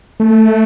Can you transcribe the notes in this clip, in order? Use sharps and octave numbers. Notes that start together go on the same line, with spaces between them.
A3